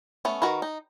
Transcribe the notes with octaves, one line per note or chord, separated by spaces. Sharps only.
A3 B3 C#4
D#3 F#4 A#4 B4
D#4